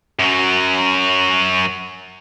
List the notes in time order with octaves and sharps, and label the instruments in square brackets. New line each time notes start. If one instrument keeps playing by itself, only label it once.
[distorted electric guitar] F#2 F#3